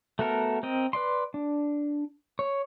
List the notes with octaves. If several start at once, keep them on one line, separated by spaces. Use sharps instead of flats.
A3 B3 F#4 A4 A#4
C4 A#4 D#5
B4 D5 C6
D4
C#5